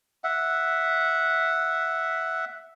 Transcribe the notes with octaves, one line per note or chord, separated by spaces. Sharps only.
E5 F#5